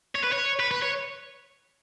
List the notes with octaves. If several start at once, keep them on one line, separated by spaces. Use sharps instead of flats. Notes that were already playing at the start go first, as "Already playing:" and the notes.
C#5
B4
C#5
B4
B4
C#5